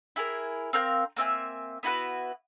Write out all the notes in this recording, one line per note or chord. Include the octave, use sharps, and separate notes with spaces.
E4 G#4 A#4
C4 A#4 F5 G6
A#3 C4 E5 G#5
B3 E4 F#4 B4